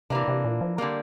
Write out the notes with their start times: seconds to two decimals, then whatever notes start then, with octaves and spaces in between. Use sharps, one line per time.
0.10 C3 E3 A#3 D4
0.28 C3
0.44 A#2
0.61 F3
0.78 D3 G3 A#3